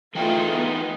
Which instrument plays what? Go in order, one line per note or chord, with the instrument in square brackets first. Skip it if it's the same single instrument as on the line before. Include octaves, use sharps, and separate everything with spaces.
[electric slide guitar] E3 D#4 G5 [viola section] A3 F4 G#4
[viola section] B3